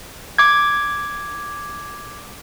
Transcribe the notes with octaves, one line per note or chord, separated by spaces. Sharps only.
D6 G#6